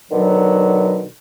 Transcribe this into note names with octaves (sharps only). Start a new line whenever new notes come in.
B2 D3 D#3 F#3